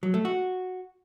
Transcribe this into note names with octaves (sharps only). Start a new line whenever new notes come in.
F#3
A3
F#4